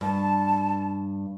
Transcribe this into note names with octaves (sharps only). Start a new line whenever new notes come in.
G2 A5